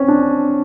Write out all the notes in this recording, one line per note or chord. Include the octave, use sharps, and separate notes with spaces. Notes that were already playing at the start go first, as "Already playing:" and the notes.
Already playing: C4 C#4
D4